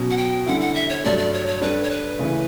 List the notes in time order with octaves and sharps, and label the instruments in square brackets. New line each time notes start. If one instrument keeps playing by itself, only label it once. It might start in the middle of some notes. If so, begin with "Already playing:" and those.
Already playing: [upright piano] B2 F#3 C#4
[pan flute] F#5
G5
[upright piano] D3 G3 C#4 E4 [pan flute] F#5
[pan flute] F#5
E5
C#5
[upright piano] G2 F#3 A3 D4 A4 [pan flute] D5
[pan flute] D5
C#5
C#5
[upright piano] G3 D4 A4 D5 [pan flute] B4
[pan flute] C#5
B4
[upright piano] C#3 E3 A3 C#4 E4